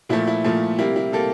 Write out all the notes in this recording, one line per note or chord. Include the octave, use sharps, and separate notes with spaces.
A#2 F3 A3 E4
E4
A#2 F3 A3
C3 G3 A#3 E4
E4
C3 G3 A#3 A4